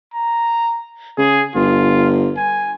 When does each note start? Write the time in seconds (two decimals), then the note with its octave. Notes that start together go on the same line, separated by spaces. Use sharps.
0.14 A#5
1.18 C#3 G#4
1.55 G1 F4
2.37 G#5